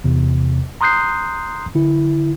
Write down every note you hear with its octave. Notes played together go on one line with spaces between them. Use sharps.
E2 C3
A#5 C6 D#6 F#6 G6 C7
D3 E4